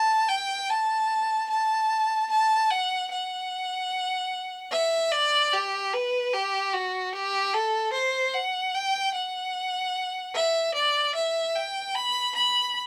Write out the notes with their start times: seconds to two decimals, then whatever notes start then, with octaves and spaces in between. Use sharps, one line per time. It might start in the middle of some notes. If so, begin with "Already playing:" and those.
Already playing: A5
0.29 G5
0.70 A5
1.50 A5
2.31 A5
2.71 F#5
3.11 F#5
4.72 E5
5.12 D5
5.53 G4
5.93 B4
6.33 G4
6.73 F#4
7.13 G4
7.54 A4
7.93 C5
8.34 F#5
8.74 G5
9.14 F#5
10.35 E5
10.75 D5
11.16 E5
11.55 G5
11.95 B5
12.35 B5